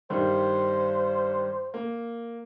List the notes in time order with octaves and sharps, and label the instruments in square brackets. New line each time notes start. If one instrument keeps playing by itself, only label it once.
[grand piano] G2 D#3 G3 [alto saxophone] C5
[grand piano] A#3